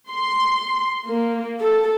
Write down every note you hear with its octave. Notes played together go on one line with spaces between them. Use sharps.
C6
A#3
A4